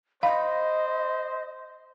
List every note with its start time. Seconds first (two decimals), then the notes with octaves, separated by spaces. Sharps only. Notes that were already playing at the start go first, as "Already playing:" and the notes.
0.23 C5 D#5 F5 B5